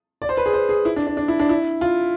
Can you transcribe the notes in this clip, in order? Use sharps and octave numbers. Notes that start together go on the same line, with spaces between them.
D5
C5
B4
G#4
C5
G#4
E4
D4
D4
D4
E4
D4
E4
F4